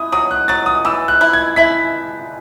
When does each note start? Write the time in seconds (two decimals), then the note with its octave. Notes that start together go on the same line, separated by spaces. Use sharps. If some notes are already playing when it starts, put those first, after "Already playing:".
Already playing: E4 D#6
0.12 F#3 D#6
0.31 F#6
0.48 F#3 A6
0.66 D#6
0.85 E3 E6
1.08 F#6
1.21 E4
1.33 G#6
1.56 E4 B6